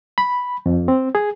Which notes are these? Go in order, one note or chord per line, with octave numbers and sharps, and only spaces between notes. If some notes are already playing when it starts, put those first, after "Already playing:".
B5
F2
C4
G#4